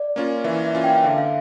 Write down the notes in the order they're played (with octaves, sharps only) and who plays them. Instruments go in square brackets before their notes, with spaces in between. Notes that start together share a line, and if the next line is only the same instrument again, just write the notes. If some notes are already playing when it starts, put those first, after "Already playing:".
Already playing: [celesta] D5
[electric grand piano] A#3 C#4 F4
[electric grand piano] E3 [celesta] E5
[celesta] E5
[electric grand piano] A#3 C#4 F4
[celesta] G5
F5
[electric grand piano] D3 [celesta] E5
[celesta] F5